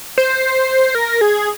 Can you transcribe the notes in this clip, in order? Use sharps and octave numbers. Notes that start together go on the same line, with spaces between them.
C5
A#4
G#4